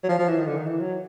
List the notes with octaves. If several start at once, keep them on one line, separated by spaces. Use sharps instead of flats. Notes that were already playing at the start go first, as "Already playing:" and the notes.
F#3
F3
F3
E3
D#3
D3
D#3
E3
F#3